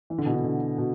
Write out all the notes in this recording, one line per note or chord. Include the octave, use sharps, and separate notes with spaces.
E3
D3
B2
D3
D3
B2